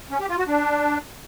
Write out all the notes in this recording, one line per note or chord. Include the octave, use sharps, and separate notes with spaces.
C#4
G4
F4
F#4
D4